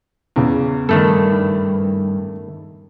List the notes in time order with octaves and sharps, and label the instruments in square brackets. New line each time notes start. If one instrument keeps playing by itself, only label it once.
[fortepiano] E2 C#3
[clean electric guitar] G2 [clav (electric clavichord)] D#3 A3 A4